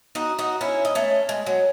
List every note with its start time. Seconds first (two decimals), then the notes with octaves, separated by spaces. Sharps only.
0.15 D#4 F#4
0.39 D#4 F#4
0.61 C#4 E4
0.85 D#4
0.95 A3 C#4
1.29 G#3
1.46 F#3